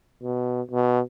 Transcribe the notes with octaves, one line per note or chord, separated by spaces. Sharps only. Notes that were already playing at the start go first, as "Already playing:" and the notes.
B2
B2